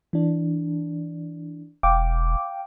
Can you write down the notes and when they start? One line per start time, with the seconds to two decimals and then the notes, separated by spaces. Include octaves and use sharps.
0.13 E3 D4
1.83 E1 F5 G5 D6